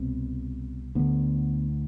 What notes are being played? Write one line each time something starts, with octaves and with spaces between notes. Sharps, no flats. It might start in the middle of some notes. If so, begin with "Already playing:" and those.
Already playing: C2 B2 C4
D2 D3 B3